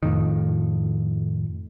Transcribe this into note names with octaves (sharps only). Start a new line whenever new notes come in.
F2 A2 D#3